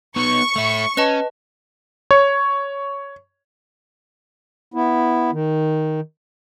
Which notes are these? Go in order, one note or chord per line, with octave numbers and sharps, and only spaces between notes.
B3 D#4 C#6
A3 E4
C#4 B4 D#5 A5
C#5
B3 E4
D#3